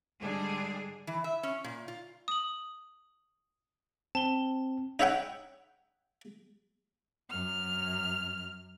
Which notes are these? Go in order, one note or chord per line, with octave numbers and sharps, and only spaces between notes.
G#2 D3 G3 G#3 D4 G#4
E3
E5
C#4
A#2
F4
D#6 F#7
C4 A5 G7
D#4 E4 C#5 E5 F#5 G5
F#2 F6